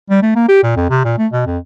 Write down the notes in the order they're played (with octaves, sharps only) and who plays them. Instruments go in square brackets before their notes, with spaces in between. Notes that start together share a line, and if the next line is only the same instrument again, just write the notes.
[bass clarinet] G3
A3
A#3
G4
A#2
F2
C3
A#2
A3
B2
F2